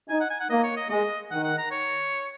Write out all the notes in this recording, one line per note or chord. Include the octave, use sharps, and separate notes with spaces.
D#4 G#5
F#5
G#5
F#5
A#3 D#5
C#5
D#5
G#3 D#5
D#3 F#5
F#5
A#5
C#5